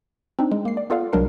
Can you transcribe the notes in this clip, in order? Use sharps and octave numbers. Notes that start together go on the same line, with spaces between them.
C4 D4 D#4
G#3
A#3 C7
D5
B3 F4 A4 D5 F5 F#5
C2 F#3 G#3 D4 A#4 C7